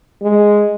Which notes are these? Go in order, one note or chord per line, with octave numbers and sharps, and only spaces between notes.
G#3